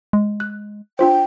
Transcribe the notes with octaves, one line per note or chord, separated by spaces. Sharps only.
G#3
F#6
D4 F4 C5 G5